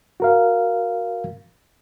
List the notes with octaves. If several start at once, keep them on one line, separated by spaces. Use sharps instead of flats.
F#4 A#4 F5